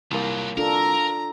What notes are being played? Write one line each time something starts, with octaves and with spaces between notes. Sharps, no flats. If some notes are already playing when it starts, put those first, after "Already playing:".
C2 F3 F#3 A#3
D4 F4 A4 A#4 A#5